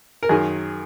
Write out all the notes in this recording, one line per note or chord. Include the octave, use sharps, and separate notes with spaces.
A#4
F#2 D#3 G#4